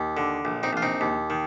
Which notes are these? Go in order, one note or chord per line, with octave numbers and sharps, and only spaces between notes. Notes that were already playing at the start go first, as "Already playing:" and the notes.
Already playing: D#2
D3
A#1
C4 D#4
A#1 F4
C4 D#4
D#2
D#3